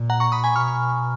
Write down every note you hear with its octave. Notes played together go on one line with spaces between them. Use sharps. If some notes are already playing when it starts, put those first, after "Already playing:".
Already playing: A#2
F#5 A#5
A#5 C#6
B5 D#6
G#5 B5
B2 C#6 F6